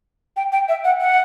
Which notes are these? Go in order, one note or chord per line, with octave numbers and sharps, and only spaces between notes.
G5
G5
E5
F#5
F#5